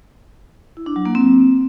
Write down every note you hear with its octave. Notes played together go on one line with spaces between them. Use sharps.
E4
D4
F#3
A#3
C4